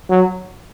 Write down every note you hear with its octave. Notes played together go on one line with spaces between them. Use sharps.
F#3